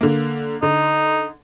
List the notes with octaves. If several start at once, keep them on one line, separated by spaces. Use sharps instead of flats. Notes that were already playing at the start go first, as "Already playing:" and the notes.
D3 A#3
D3 D#4